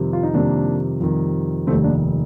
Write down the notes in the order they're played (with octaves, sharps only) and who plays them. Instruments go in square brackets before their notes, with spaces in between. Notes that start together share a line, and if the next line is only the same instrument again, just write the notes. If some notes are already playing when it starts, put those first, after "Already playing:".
Already playing: [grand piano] F2 C3 D#3 G3
F4
D#4
F2 C3 D#3 G3 A#3 D4
F2 C3 D#3 G3
F1 D#2 D#3 G3 A3 C4
A#3 D4